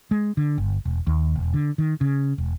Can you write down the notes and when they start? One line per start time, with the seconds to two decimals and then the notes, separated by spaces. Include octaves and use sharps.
0.11 G#3
0.37 D3
0.58 G1
0.85 E1
1.07 D#2
1.36 E1
1.54 D3
1.78 D#3
2.01 C#3
2.38 E1